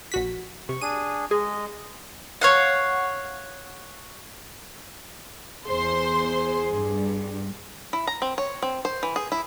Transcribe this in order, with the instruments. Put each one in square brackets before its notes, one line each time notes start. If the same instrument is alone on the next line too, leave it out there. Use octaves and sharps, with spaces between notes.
[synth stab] A#1 F#4 B6
[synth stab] C3 [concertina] C#6
[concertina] D4 G#4 [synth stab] D#7
[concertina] G#3 D#5 [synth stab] G#4
[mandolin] C#5 F5 F#5
[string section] E2 C5 C6 [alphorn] G#4
[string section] G2
[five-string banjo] E4
A#5
C4
C#5
C4
C5
E3
G#4
E4